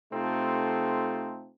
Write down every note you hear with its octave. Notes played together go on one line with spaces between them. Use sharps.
C3 A3 C4 D#4 F4 A4